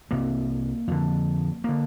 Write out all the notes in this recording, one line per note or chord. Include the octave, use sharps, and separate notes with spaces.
C2 C3 A#3
F2 D3
D3 A#3